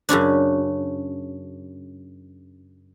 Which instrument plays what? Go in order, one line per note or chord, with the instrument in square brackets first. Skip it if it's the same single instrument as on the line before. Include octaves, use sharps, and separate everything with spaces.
[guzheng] F#2 C#3 C#4 D4